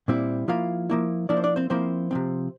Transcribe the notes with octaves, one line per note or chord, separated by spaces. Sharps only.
A#2 G3 C4 E4
F3 A#3 E4 F4 F5
F3 A#3 E4
F3 A#3 D4 E4 D5
C5
D4 D5
C4 C5
F3 A#3 C4 E4 C5
C3 F3 C4